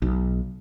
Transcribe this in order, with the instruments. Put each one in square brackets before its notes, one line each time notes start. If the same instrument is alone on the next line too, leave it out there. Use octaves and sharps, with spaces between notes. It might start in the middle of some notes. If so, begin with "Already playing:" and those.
[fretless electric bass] B1